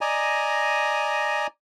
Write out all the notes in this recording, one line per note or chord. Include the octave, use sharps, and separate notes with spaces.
D5 D#5 G#5 A#5